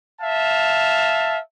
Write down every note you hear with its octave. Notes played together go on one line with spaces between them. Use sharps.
E5 F5 A5